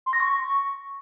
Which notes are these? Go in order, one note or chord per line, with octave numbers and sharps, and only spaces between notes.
C6
A#6
C#6